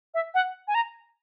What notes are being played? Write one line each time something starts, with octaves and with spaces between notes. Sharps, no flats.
E5
F#5
G#5
A#5